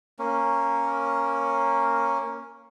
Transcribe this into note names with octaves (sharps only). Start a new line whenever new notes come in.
A#3 C#4